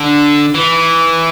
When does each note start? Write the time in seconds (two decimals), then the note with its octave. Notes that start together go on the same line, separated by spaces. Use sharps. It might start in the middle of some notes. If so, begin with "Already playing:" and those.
Already playing: D3
0.55 E3